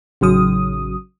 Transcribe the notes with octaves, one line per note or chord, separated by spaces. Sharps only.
A1 C#3 F#3 D#6